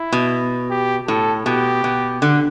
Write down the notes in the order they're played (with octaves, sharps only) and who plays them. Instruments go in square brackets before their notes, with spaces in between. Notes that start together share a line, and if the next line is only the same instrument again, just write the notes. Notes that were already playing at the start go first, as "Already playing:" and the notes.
Already playing: [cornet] E4
[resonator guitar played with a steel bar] B2
[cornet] G4
[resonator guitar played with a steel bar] A2 [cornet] A4
[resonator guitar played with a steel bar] B2 [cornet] G4
[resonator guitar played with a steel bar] B2
D3